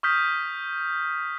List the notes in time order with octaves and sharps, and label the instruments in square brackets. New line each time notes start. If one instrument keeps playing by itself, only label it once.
[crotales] C#6 D#6 F6 G6 B6